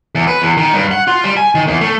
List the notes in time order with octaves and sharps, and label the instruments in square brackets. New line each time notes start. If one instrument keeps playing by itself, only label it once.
[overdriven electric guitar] E2
B4
E2
D#3
G2
F#5
F4
G3
G#5
D#3
E2
A3